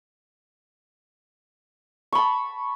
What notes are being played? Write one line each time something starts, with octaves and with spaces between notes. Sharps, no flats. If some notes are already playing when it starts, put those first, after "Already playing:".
A5 B5 C#6